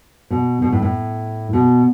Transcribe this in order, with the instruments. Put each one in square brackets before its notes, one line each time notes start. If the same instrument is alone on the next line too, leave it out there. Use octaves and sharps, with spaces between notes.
[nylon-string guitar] B2
B2
A2
A2
B2